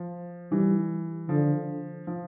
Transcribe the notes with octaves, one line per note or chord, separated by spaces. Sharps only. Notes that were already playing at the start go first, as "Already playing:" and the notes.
Already playing: F3
E3 G3
D3 F3
F3